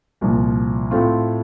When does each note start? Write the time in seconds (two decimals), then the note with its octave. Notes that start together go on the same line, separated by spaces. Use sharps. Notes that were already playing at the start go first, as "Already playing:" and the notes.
0.21 C2 A#2 F3
0.91 A2 A3 C4 F4